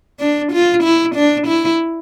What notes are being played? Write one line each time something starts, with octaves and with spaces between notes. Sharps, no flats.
D4
F4
E4
D4
E4